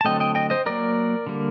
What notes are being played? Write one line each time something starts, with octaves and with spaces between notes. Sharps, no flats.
A5
D3 F#3 A3 C4 D#5 G5
D#5 G5
D#5 G5
C5 D#5
F#3 A#3 A#4 D5
D3 G3 A#3